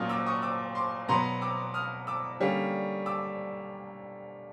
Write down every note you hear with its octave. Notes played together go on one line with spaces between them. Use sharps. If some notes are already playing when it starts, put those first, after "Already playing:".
Already playing: A#2 F#3 A#3 C#4 D#6 F6
D6 E6
C#6 D#6
D6 E6
C6 D6
B2 F#3 B3 A#5 C6
D6 E6
D#6 F6
D6 E6
D3 G3 A#3 C#4
D6 E6